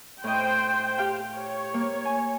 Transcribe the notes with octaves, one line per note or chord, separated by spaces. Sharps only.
A2 C5 D#5 G5
G4 F5 G5
C#5
A#3
G#5